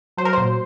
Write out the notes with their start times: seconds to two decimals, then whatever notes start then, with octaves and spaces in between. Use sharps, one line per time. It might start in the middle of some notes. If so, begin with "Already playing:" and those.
0.17 F#3 C5
0.25 A#4
0.33 A#2 C5